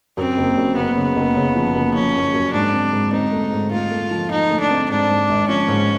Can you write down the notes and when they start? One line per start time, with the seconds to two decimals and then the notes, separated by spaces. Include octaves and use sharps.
0.17 F#2 C4
0.37 F#1
0.57 F#2
0.76 F#1 B3
0.97 C#3
1.16 F#1
1.36 C#3
1.56 F3
1.75 F#1
1.94 F3 C#4
2.15 F#1
2.34 F#2
2.53 G#2 D4
2.73 C4
2.93 G#2
3.13 C4 D#4
3.32 A3
3.52 G#2
3.72 A3 F4
3.91 A3
4.11 F3
4.30 F3 D#4
4.50 A3
4.60 D4
4.70 C4
4.90 G#2 D4
5.09 G#2
5.29 G#1
5.49 F3 C#4
5.68 G#2